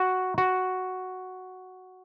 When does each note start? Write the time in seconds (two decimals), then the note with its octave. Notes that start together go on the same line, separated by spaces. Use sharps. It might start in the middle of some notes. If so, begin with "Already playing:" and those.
Already playing: F#4
0.38 F#4